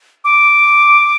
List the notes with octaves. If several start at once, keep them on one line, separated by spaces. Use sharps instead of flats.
D6